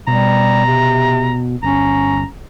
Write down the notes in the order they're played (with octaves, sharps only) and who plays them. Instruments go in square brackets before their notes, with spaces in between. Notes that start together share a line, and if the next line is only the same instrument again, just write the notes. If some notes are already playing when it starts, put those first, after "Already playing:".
[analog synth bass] B2 [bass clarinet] G3 [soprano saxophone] A#5
[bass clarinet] C3
[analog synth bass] G1 [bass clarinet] C#4 [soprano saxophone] A#5